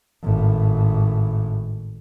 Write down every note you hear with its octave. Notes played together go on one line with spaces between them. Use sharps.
G#1 A2